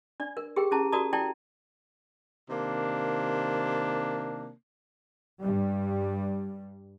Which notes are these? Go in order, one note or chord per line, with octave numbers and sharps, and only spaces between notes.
D4 D5
A#4
G4 G#4 A#4 G5
C#4 E4 G#4 A5 A#5
F#4 A#4 D5 A5 A#5 D#6
E4 D5 G5 A5 A#5
C3 D#3 A#3 D4
G2 G3